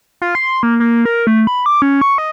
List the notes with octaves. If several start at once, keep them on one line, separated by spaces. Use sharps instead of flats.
F4
C6
A#3
A#3
A#4
A3
B5
D6
C#4
C#6
D#5